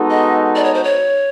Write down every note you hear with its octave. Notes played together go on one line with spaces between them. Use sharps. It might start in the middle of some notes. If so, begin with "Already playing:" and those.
Already playing: G#3 B3 D#4 F#4 A4
D#5
D5
C#5
C5
C#5